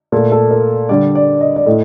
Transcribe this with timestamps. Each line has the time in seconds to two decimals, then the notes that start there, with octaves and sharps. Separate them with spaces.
0.12 A#2 A3 A4
0.32 A4
0.51 A#4
0.89 D3 G3 D5
1.15 D5
1.41 D#5
1.56 D5
1.66 A2 A3 D#5